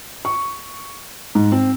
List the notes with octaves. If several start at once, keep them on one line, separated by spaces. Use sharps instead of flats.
C#6
G#2
C4